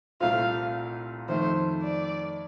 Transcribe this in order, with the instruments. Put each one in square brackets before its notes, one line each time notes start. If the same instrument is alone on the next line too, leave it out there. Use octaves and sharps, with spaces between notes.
[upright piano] C2 A#2 A3 C4 F4 [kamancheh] F5
[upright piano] F2 D#3 A3 [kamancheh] C5
[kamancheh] D5